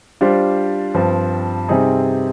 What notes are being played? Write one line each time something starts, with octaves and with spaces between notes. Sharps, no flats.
G3 D4 F4 C5
G2 F3 C4
C3 G3 C4 D#4 G#4